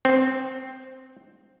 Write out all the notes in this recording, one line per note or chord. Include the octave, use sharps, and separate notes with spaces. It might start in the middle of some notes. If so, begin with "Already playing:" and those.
C4